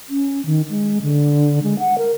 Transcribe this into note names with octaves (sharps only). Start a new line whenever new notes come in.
C#4
D#3
G#3
D3
G#3
F#5
A#4